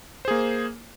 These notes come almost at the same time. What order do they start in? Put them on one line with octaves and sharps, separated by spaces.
C5 G#4 A#3